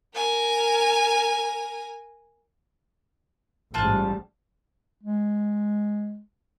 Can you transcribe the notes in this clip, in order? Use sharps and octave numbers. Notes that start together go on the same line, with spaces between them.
A#4 G#5
A1 G#2 G3 F4 A5 F#6
G#3